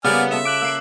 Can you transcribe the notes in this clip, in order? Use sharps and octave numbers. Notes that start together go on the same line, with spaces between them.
C#3 G3 A#3 B3 D5 G#5 F6
F4 A4 E5 E7
D6 F#6 D7 F#7
A#3 E6 C7